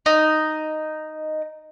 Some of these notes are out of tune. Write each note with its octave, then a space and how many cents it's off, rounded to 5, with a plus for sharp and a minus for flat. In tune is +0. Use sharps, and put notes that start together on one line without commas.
D#4 -5